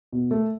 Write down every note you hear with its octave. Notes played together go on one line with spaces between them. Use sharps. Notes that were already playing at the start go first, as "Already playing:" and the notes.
B2
A3